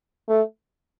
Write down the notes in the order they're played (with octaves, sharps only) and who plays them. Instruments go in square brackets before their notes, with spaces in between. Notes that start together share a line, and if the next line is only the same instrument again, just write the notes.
[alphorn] A3